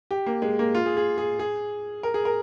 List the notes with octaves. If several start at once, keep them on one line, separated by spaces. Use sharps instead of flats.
G4
A#3
G#3
A#3
F4
G#4
G#4
G#4
G#4
A#4
G#4
A#4